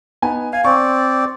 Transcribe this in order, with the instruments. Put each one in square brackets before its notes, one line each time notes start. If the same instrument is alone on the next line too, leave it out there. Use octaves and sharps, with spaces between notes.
[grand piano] B3 D#4 G#5
[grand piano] F5 [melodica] G#5
[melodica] C4 D5 [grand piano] C#6